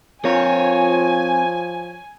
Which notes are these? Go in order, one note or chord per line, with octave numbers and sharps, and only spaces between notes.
F3 C4 F4 A#4 C#5 G#5